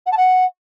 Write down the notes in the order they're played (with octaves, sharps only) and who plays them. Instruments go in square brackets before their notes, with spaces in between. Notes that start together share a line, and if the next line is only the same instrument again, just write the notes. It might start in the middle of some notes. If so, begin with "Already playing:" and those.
[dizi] F#5
A5
F#5